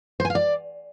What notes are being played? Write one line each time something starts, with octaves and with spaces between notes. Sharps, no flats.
C5
G#5
F5
D5